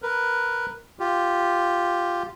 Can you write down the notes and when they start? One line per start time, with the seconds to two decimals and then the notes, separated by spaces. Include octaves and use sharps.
0.02 A#4 B4
1.00 F4 G4